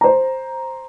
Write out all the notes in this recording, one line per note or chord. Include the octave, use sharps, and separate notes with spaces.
C5 A#5